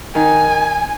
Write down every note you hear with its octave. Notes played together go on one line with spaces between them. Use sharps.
D#3 D#4 G#5